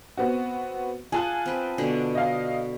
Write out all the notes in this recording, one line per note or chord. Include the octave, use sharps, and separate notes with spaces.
B3 C4 F#4
F4 G#4 F#5 G#5 A5 F#6
C4 B4
B2 D3 D4
D#5 F5